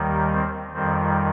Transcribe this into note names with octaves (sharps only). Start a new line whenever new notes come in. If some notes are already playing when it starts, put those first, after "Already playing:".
Already playing: D#2 D#3 G3
C4
F2 D#3 G3 C4